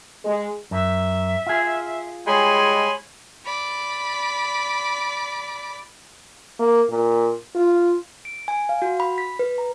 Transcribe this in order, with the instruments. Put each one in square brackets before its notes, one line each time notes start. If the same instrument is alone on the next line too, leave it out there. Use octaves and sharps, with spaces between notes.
[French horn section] G#3
[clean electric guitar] F#2 [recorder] E5
[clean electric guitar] F4 G#4
[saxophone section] G3 G#3 [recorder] C#5 [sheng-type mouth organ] G#5 B5 C6
[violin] D5 B5
[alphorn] A#3
A#2
F4
[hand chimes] D7
G#5
F5
F#4
B5
B6
B4
A#5